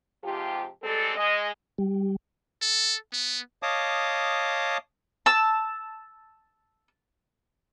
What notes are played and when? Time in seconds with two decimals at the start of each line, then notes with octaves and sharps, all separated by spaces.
0.23 G#2 C3 F3 F4 G4
0.82 G3 G#3 C4 A4
1.16 G#3 D#5
1.78 G3
2.62 A4
3.13 B3
3.63 C#5 D#5 F5 A5 D6 D#6
5.26 A5 E6